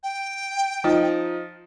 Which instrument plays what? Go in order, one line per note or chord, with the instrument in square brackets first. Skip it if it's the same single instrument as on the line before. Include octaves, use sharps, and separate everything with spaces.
[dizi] G5
[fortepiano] F3 D#4